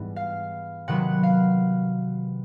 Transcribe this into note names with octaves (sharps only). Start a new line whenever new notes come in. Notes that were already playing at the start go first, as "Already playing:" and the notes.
Already playing: G#2 E3 G3 B3
F5
C3 D#3 F#3 B3 F#5
F5